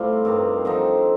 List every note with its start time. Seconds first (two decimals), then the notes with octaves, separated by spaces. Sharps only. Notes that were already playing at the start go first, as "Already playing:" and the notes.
Already playing: A2 C3 G3 C4 F4
0.25 G2 D#3 G3 C4
0.65 D3 F3 C4 D#4